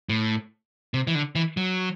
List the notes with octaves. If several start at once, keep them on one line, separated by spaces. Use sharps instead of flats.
A2
C3
E3
D3
E3
F#3